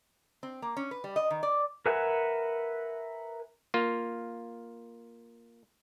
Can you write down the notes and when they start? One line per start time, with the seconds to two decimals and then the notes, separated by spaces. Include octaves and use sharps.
0.43 C4
0.62 A#3
0.77 C#4
0.91 B4
1.04 G3
1.16 D#5
1.30 D#3
1.43 D5
1.86 A#4 B4 E5 F#5 G#5
3.74 A#3 F4